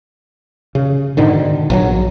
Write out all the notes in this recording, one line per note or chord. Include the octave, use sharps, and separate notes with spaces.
C#3
G#2 B2 D3 D#3
A#1 F3 F#3